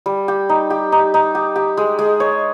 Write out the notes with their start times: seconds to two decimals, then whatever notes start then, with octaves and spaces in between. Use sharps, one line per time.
0.06 G3
0.28 G4
0.49 D#4
0.70 G4
0.92 D#4
1.14 D#4
1.35 G4
1.56 G4
1.77 G#3
1.99 G#3
2.20 C#5